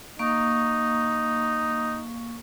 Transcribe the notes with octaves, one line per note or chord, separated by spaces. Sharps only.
A#3 D#4 F5 C#6